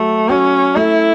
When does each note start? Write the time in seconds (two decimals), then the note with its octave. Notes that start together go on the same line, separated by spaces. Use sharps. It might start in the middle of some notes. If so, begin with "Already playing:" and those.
Already playing: F#3 A3
0.29 F#3 C#4
0.76 A3 E4